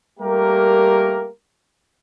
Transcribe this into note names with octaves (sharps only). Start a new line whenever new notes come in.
G3 A3 A#3 G4 A#4